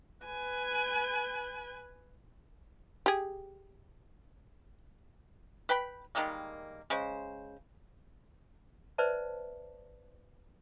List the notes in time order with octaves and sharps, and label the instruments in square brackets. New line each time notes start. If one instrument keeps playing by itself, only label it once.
[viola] B4 G#5
[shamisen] G4 G#4
[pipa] B4 G5 B5
D#3 G3 G#3 A#3
C#3 G#3 C5
[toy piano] B4 C5 D5 E5 A5